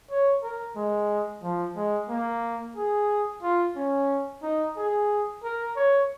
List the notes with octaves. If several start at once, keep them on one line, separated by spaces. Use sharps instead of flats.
C#5
A#4
G#3
F3
G#3
A#3
G#4
F4
C#4
D#4
G#4
A#4
C#5